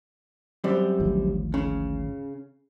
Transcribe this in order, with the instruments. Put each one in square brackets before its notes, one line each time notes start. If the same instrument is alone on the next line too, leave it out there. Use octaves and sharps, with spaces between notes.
[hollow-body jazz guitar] F#2 G3 C4
[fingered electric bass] G#1 D2 F3
[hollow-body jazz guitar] C#3